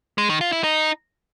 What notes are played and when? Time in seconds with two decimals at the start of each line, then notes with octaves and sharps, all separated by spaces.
0.18 G#3
0.29 D#3
0.41 F4
0.52 E4
0.64 D#4